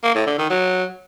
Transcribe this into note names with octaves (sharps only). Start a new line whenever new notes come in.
A#3
A2
D3
D#3
F#3